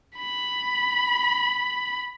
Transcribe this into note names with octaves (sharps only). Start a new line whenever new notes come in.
B5